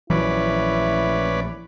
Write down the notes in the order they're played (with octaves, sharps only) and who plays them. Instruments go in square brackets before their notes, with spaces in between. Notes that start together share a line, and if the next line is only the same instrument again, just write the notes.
[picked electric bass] A#1 E3 F#3 [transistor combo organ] C#4 B4 D5 [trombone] E4